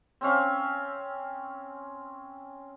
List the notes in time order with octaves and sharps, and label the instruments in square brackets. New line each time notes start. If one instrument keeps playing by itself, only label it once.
[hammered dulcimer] C4 C#4 F5